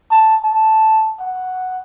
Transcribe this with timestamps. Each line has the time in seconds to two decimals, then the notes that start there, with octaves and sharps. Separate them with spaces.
0.11 A5
0.44 A5
1.20 F#5